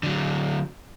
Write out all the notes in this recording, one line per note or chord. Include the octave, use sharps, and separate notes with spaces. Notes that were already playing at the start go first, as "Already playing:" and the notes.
D3 F#3